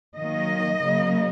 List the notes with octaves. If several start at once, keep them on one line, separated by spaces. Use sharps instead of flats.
D#3 F#3 A#3 D#5
C#3 F#3 A#3